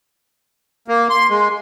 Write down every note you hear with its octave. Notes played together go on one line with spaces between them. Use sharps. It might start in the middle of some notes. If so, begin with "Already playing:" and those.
A#3
C6
G#3